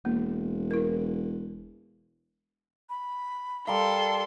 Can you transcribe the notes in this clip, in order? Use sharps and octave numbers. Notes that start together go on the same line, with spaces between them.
E1 A#3
E4 A#4
B5
G3 A4 A#4 F5 C6